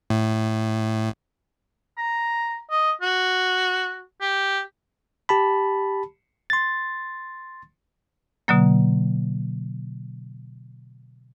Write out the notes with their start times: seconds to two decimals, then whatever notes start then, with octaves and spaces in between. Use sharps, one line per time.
0.10 A2
1.98 A#5
2.71 D#5
3.02 F#4
4.21 G4
5.29 G4 A5 B5
6.50 C6 A6
8.48 B2 D3 F#3 A#3